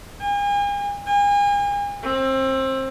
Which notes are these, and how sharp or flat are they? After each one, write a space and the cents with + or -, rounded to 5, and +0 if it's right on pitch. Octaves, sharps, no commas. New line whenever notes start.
G#5 -40
G#5 -40
C4 +25